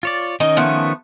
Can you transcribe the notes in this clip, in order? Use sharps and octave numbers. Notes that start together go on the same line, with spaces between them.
F4 C#5 D5
D#3 C#4 D#4 D#5
F3 A3 B3